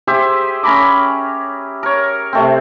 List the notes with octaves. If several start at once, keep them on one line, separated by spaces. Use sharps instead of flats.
G4 G#4 C5 E5
C#4 A#5 B5 D6
A#4 C#5
C3 A3 C4